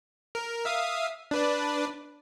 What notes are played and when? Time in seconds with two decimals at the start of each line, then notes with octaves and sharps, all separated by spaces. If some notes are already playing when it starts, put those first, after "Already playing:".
0.35 A#4
0.65 E5 F5 D#6
1.31 D4 B4 D5